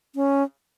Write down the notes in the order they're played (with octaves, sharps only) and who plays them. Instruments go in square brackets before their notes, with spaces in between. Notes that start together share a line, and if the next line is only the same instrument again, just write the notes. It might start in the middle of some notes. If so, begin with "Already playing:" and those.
[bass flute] C#4